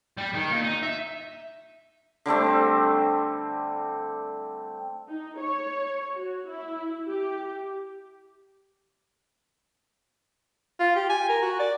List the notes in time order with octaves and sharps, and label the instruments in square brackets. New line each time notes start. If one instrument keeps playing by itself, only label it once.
[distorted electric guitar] G3
D#3
A#2
D#4
E5
[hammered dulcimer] D3 G3 A3 C4
[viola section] D#4
C#5
F#4
E4
G4
[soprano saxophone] F4
G4
G#5
A#4
F#4
D5